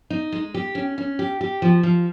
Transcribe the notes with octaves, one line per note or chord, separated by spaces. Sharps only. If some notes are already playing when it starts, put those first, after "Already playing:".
D#4
G#3
G4
C#4
C#4
G4
G4
F3
F3